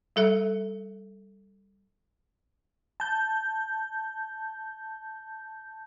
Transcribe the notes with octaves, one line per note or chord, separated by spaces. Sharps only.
G3 A4 E5
A5 G6